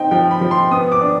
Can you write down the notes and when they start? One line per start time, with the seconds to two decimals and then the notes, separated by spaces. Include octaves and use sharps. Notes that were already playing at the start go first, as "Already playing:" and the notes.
Already playing: C4 D#4 G5
0.11 F3 G5
0.31 B5
0.41 F3
0.51 C6
0.71 B3 D#6
0.92 D6
1.01 D4